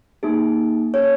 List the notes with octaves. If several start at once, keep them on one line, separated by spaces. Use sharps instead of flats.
A#3 D#4 G#4
A#3 C#4 G#4 C#5